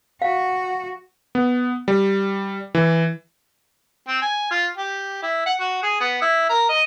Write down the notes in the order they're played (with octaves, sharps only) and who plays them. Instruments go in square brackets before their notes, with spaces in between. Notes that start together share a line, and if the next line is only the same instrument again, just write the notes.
[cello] F#4 [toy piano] F5 [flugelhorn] F#5
[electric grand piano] B3
G3
E3
[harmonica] C4
G#5
F4
G4
E4
F#5
F#4
G#4
B3
E4
A#4
D#5